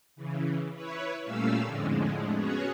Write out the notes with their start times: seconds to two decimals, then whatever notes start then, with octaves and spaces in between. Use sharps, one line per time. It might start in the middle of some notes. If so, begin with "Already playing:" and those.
0.16 C#3 E3
0.74 E4 B4 C#5
1.24 A#2 G3 A3 C#4 F5 E6
1.64 F2 A2 D3 G#3
2.35 B3 C#4 F#4 G#4 C#5